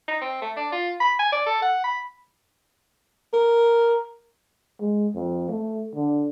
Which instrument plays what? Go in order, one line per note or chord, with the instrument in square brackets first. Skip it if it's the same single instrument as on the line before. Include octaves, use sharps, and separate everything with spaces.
[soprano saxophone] D#4
C4
A3
D4
F4
B5
G#5
D5
A4
F#5
B5
[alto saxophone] A#4
[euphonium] G#3
F2
A3
D3